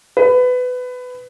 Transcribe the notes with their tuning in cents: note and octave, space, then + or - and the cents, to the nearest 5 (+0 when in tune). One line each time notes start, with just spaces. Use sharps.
B4 +20